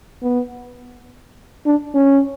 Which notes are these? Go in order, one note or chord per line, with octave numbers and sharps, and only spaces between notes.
B3
D4
C#4